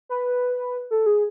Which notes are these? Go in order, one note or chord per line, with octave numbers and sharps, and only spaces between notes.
B4
A4
G#4